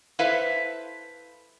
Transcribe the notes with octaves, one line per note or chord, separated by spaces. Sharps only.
E4 A4 B4 C5 E5 F5